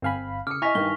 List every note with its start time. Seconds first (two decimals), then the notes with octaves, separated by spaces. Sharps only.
0.02 G1 C4 F5 G#5 B5
0.47 C#3 D6 D#6 F6 C#7
0.62 E4 D#5 G#5 C#6 F6 A#6 B6
0.75 G2 D#3 G7